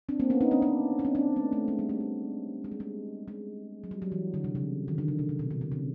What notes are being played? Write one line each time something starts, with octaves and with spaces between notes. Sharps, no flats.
C4 D4
A#3 C4
B3 C#4
C#4 D#4
C4 D4
C4 D4
C#4
C4 D4
C4 D4
A3 B3
A3
G#3
G3
A3
A3
G#3
G3
G#3
G#3
F#3
G3
F#3
E3
D3
C3
C#3
D#3
D3
C#3
C3
C3
B2
C3
C3
C#3